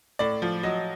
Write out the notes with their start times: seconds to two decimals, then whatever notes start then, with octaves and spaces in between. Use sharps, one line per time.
0.19 A2 D5
0.42 F3
0.63 F#3 D#5